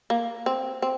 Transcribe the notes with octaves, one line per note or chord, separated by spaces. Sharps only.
A#3
C4
C4